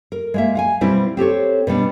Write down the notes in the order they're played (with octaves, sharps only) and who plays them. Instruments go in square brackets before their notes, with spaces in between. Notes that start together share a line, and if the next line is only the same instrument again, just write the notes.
[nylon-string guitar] A#4
G#3 A#3 E5
F5 F#5 G#5
B2 G3 C4 E4
C4 G4 A4 C#5
B2 G3 B3 D4